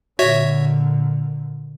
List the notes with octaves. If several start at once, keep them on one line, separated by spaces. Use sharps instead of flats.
A#2 D3 F#4 C#5 E5